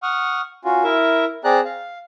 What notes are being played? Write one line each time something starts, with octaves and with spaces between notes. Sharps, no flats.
F#5 C#6 D#6 F6
C#4 F4 F#4
E4 A#4 E5
C4 G#4 D5 A#5 F#6
F5